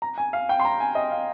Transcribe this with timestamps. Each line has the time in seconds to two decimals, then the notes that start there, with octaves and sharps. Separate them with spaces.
0.02 A#5
0.18 G#5
0.33 F5
0.49 G5
0.60 C6
0.65 A#5
0.80 G#5
0.95 D#5
1.11 F5